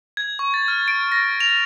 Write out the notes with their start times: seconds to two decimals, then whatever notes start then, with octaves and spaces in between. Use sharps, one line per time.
0.17 G#6
0.39 C#6
0.54 A6
0.68 F6
0.88 D7
1.12 A#6
1.40 F7